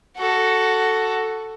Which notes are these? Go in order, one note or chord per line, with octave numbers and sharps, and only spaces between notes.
F#4 A4